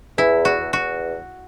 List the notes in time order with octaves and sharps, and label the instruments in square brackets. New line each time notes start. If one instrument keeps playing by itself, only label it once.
[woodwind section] E2 [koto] E4
[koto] F#4
[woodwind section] E2
[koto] F#4